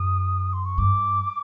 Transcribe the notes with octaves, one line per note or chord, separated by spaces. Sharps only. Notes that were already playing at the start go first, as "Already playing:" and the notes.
Already playing: F#2 D#6
C6
C#6
G2 D6